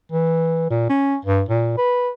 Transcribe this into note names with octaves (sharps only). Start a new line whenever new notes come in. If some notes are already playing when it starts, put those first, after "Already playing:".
E3
A#2
C#4
G2
A#2
B4